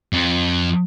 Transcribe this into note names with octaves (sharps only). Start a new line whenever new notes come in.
F2